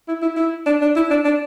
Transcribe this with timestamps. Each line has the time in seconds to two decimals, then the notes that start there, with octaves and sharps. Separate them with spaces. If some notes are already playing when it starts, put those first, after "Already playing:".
0.08 E4
0.22 E4
0.37 E4
0.66 D4
0.82 D4
0.96 E4
1.10 D4
1.25 D4